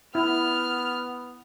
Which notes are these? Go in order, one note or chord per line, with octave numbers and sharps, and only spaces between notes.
B3 E4 F6